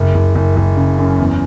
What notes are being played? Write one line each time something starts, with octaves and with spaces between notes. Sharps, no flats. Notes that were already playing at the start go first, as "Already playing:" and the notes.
Already playing: F#1
F#1
F#1
F#1
C#3
F#2
E2